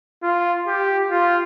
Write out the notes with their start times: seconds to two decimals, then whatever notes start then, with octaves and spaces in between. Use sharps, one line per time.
0.23 F4
0.67 G4
1.11 F4